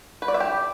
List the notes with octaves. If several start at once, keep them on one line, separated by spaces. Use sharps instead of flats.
B4
D5
E5
G4